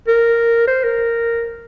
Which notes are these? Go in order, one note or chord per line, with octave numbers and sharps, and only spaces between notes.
A#4
C5
A#4